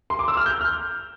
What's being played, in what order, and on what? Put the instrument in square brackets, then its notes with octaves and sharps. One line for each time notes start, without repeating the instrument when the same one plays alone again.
[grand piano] C6
D6
E6
F6
G6
F6